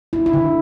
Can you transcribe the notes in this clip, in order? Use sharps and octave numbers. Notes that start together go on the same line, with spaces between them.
E4
E4
D3